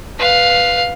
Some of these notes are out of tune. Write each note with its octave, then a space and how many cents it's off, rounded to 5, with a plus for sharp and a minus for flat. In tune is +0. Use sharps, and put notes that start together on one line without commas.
B4 +0 F5 +5